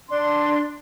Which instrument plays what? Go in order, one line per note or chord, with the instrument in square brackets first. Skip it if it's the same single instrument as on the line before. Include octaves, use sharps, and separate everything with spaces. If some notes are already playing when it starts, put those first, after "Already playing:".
[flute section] D4 C6